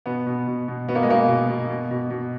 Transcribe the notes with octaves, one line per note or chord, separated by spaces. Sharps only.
B2 B3
B2
B2
B2
B2 B3
A#3
G#3
B2 A#3
B2
B2
B2
B2
B2